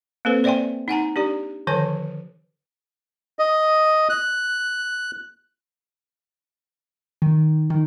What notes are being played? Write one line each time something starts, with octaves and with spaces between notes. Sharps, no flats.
A#3 C4 A4 B4 C5
C5 D5 E5 G5 G#5 C6
D#4 F#5 G#5 A#5
D4 G4 D5
D3 D#3 F3 B4 C#5 G#5
D#5
F#6
D#3
D#3